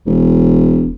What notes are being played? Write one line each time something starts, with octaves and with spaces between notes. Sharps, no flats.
E1